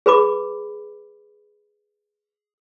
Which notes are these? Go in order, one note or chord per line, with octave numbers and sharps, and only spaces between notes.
G#4 B4 B5 D6